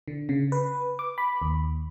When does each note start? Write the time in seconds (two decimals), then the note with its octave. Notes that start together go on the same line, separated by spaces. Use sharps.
0.08 D3
0.29 C#3
0.52 B4
0.99 D6
1.18 B5
1.42 D#2